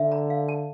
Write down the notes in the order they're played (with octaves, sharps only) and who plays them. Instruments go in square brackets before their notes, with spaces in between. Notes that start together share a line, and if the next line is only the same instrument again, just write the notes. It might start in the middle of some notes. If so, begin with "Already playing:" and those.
Already playing: [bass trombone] D3 [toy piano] E5
[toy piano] A#5
F5
A5